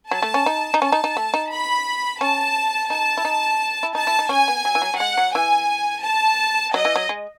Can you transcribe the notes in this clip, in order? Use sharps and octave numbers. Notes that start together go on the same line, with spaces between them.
F#3 A5
A3
C#4
D#4
D#4
C#4 A5
D#4
D#4
A3
D#4
B5
C#4 A5
D#4 A5
E4
D#4
E4
D#4 A5
E4
D#4
C#4 G#5
B3
F#3
E3
F#3
F#3
G#3 F#5
F#3
E3 G#5
A5
F#3 D#5
E3
F#3
G#3